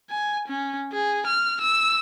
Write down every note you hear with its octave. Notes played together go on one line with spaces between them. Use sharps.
G#5
C#4
G#4
F6
E6